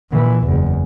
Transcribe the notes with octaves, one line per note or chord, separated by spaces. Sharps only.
A#2 E3
F#1 E2